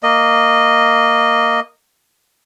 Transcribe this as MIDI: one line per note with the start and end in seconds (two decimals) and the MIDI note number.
0.03 1.60 58
0.03 1.60 75